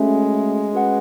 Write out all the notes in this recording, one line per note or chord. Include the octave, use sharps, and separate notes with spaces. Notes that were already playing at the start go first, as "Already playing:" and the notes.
Already playing: G#3 A3 C#4 F#4 A4 E5
C#4 F#4 B4 F#5